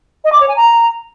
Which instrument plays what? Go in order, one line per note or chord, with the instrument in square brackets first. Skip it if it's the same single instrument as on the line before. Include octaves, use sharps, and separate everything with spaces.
[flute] D#5
D6
C#5
G#5
A#5